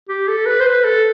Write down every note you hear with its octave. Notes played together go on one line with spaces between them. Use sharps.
G4
A4
B4
C5
B4
A4